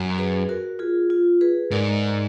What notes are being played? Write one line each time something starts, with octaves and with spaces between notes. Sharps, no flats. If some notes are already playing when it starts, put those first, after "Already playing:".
Already playing: F#2
G#4 B4
F#4 A#4
F4 G#4
F4
G#4 B4
G#2 A#4 D5